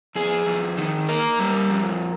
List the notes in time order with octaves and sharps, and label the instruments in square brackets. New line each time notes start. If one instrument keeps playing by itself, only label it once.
[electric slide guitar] F2 G#4
F2
D#3
A#3 A#4
G3
F2